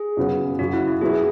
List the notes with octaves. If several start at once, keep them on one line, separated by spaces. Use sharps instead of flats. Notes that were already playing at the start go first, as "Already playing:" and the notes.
Already playing: G#4
F#2 C#3 F#3 B3
F#2 C#3 F#3 F#4
E4
E4
B2 F#3 B3 E4 G#4
G#4